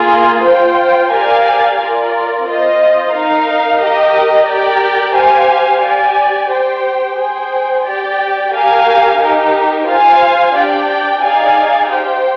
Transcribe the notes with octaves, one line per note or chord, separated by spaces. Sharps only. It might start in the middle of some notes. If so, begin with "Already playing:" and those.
Already playing: A#3 F4 G#4
F4 C5 G5
G4 A#4 D5 F5 G#5
F4 A#4 D5
C4 F4 C5 D#5
D#4 A#4 F5
G4 A#4 D#5
G4 A#4 D5 G5
G4 C5 F5 G#5
G4 D5 G#5
G4 C5 G5
G#4 C5 G5
G4 D5 G5
G4 A#4 F5 G#5
D#4 G4 A#4
F4 C5 F5 G#5
D4 G4 D5 G5
D#4 G#4 D5 F5 G#5
G4 C5 G5